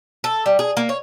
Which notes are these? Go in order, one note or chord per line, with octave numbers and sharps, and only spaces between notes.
A4
G3
G#4
A#3
C#5